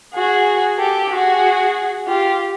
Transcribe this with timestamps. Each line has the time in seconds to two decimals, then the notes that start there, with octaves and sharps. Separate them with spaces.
0.14 F#4 G#4
0.79 G4 A4
1.11 F#4 G#4
2.07 F4 G4